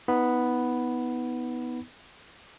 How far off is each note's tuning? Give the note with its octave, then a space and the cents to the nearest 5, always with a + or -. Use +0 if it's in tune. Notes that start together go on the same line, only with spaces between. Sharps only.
B3 +0 D#4 +30 B5 +0